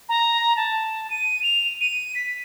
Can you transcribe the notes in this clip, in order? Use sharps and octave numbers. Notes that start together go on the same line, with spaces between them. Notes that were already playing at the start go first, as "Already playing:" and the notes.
A#5
A5
D#7
F7
D#7
B6